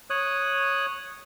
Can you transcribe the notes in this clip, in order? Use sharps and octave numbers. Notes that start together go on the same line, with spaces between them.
C#5 D#6 F#6